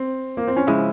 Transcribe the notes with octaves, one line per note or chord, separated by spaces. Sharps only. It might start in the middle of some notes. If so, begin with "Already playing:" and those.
Already playing: C4
A#3
C4
C#4
C#3 F3 G#3 C#4 E4